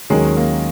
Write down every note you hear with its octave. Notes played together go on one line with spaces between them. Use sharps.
D#2 D#3 F#3 G#3 C#4 G#4
A#3